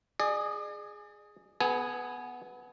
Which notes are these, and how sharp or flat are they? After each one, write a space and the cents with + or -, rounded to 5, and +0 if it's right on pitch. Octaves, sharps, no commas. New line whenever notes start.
G#4 +0 D5 +40
B3 +0 G#4 +40 G#5 +0